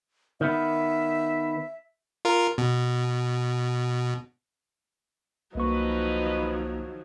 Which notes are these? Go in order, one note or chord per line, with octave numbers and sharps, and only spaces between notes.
D#3 B3 E5
F4 A#4
B2
C2 D#3 F3 F#3 A#3 B4 D#5 C#6